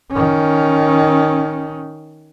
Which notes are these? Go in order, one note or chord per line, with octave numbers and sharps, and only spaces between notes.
D#3 C#4